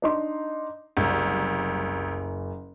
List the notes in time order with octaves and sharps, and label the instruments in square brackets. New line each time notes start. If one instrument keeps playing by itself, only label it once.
[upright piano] D4 D#4 C6
[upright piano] F#1 F#2 [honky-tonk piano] C2